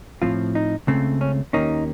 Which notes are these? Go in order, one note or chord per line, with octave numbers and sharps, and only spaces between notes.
A2 F3 C4 F4
D#4
C#2 C#3 A3 C4
C#4
D#2 D#3 A#3 C#4 D#4